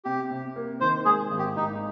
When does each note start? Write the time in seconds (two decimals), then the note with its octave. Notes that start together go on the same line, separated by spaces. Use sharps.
0.05 C3 G4
0.31 C3
0.56 A#3
0.80 D#3 C5
1.05 G#3 G#4
1.31 G#1
1.39 G4
1.56 G#2 D#4